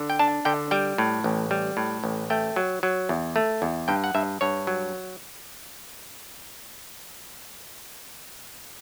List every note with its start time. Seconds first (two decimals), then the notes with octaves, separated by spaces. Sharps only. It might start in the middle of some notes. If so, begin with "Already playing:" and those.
Already playing: D3
0.10 G5
0.19 D4 A5
0.45 D3 G5
0.71 G3 G5
0.98 A2
1.24 A1
1.51 G3
1.77 A2
2.04 A1
2.30 A3 G5
2.56 F#3
2.83 F#3
3.09 E2
3.36 A3
3.62 E2
3.88 G2 G5
4.04 F#5
4.15 G2 E5
4.41 G2 C#5
4.67 F#3